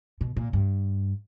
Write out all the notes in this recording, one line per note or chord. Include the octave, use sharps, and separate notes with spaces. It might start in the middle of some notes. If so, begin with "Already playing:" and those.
B2
A#2
G2